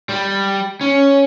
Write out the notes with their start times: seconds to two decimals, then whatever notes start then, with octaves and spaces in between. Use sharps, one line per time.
0.09 G3
0.81 C#4